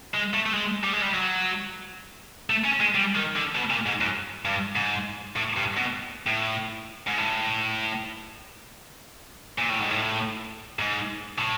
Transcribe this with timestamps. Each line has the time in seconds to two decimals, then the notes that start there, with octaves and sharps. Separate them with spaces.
0.14 G#3
0.34 A3
0.46 A3
0.54 G#3
0.84 G3
0.93 G#3
1.02 G3
1.14 F#3
2.50 A3
2.65 C#4
2.80 G#3
2.95 G3
3.15 D#3
3.36 D3
3.55 B2
3.70 A#2
3.86 G#2
4.00 F#2
4.45 G2
4.76 G#2
5.36 A2
5.57 G2
5.77 B2
6.26 A2
7.07 G#2
7.17 A2
9.58 A#2
9.69 A2
9.80 G#2
9.91 A2
10.79 G#2
11.38 A2